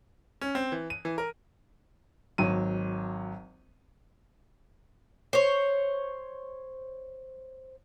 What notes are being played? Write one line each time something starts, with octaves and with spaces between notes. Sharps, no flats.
C#4
C4
E3
D#7
E3
A#4
G#1 F#3 D#7
C5 C#5